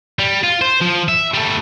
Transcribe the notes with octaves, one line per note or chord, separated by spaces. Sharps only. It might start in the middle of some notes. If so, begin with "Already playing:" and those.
G3
F4
C5
F3
E5
G3 A3